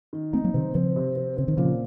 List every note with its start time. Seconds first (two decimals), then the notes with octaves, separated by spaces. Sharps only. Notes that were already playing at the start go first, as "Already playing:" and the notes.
0.13 D#3
0.33 A3 C4 D#4
0.44 F#3 A#3
0.54 C3 D#3 C4
0.75 C#3 F3 C4
0.96 C3
1.16 C4
1.37 C#3 C4
1.48 D#3
1.57 A#2 C#3 F3